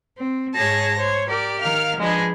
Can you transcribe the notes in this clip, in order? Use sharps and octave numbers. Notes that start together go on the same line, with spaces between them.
C4
G#2 G#4 C#5 A5 A#6
C5 C#5
G4 A#4 D5
D#3 A#4 F5 F6
F3 G#3 D4 G#4 B4 D#5